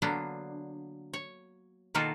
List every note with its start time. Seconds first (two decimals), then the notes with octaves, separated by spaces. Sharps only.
0.02 D3 F#3 A#3 B3 D4
1.13 C#5
1.94 B2 D#3 A#3 F4 F#4 A4